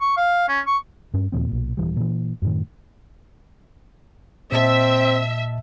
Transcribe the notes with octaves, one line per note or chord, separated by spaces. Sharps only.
C#6
F5
C#4
C#6
G2 C#4
D#2 A#2 F3 C4
B1 A#2
D#1 C2 E3 G3
A#2 E3
F#2 A2 D#3
A#2 C4 D#5 E5 A5